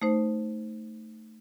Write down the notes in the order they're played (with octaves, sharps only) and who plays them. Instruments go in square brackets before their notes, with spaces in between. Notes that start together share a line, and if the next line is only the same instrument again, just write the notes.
[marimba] A3 D#4 C5